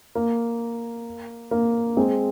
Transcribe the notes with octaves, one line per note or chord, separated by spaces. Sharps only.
A#3
A#3
G#3 C4